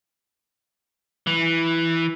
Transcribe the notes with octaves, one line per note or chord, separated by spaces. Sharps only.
E3